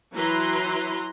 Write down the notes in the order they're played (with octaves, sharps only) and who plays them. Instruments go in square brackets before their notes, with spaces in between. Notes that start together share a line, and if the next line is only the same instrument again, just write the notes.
[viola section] E3 F#3 E4 B4 A#5 C6